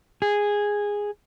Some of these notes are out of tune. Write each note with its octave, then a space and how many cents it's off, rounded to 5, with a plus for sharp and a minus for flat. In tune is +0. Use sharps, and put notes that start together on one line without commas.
G#4 -10